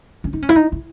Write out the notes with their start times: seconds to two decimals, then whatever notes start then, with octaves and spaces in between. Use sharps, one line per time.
0.24 C#4
0.33 D#4
0.42 C#4
0.49 E4
0.56 D#4
0.72 E4